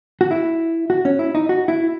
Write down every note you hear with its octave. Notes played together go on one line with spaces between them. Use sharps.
F#4
E4
F#4
C#4
E4
D#4
F#4
E4